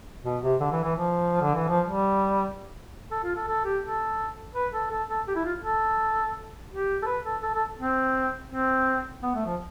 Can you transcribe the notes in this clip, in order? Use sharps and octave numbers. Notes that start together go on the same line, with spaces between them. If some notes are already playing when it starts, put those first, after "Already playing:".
B2
C3
D3
E3
E3
F3
D3
E3
F3
G3
A4
F4
A4
A4
G4
A4
B4
A4
A4
A4
G4
E4
F4
A4
G4
A4
B4
A4
A4
A4
C4
C4
B3
A3
F3